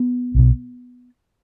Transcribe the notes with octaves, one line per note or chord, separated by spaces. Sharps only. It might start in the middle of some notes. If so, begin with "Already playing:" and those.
Already playing: B3
B1 B2